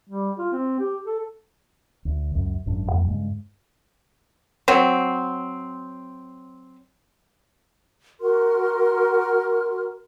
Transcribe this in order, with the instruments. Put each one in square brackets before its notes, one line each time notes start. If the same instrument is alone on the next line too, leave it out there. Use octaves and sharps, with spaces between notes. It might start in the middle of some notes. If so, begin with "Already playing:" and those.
[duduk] G3
F4
C4
G4
A4
[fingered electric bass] D2
C#2 F#2
G#1 F#2 D4
F2 F#3 A#3
G2 C#3 G#3
[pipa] F#3 C4
[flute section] F#4 A#4 C6 F6